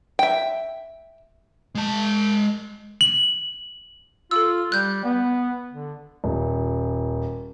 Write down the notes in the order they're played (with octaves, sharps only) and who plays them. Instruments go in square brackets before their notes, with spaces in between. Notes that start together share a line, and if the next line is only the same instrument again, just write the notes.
[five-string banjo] E5 G5
[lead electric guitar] G#3 A5
[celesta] F#7
[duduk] F4 [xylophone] A4 E6
[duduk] G3 [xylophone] F#6 G6
[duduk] B3
D3
[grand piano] D#1